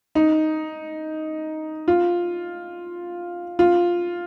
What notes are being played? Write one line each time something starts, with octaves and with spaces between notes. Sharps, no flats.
D#4
F4
F4